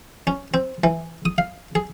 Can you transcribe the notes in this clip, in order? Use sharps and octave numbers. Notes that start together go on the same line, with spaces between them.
C#4
C4
E3
D#6
F5
G#4